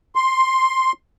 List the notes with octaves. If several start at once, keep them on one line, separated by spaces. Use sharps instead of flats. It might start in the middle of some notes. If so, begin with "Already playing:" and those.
C6